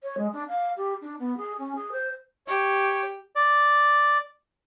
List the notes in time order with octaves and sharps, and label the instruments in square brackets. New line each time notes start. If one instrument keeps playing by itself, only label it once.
[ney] C#5
G#3
D4
F5
G4
D4
B3
G#4
C#4
G#4
C5
[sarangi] G4 [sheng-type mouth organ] C#5
[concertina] D5